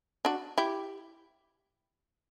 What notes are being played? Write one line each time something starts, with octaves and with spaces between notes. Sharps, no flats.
D4 F#4
E4 G4